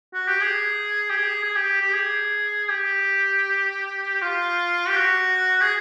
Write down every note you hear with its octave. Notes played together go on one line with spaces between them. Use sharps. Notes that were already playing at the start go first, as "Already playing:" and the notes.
F#4
G4
G#4
G4
G#4
G#4
G4
G4
G#4
G4
F4
G4
F#4
G#4